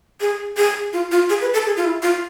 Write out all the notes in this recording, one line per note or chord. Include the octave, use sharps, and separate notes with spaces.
G#4
G#4
F4
F4
G#4
B4
A4
G#4
F4
E4
F4